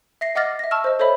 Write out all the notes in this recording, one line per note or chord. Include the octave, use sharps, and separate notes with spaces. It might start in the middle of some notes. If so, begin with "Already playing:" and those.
E5 A#6 C7
D#5 F#5 D6 F6 A6 A#6
E5 A#6
A5 C#6 E6 F6
C5 D#5
A4 C5 C#5 D#5 E5 B5